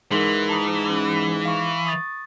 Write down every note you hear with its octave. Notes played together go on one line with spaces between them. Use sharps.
G#2 E3 A#4 C6
A5 A#5 D#6
C#4
F5 C#6
C#6 D#6 A6